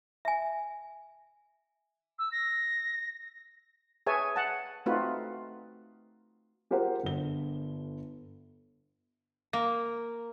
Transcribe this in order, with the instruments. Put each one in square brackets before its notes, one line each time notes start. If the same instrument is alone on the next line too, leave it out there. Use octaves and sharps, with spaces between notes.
[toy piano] E5 G#5
[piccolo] E6
A#6
[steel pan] G#4 B4 C#5 E5 G#5 A5
F#5 A5
A3 C4 D#4 F4 F#4 B4
[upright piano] F4 G4 G#4 A#4 C5 F#5
G1 D3 G7
[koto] A#3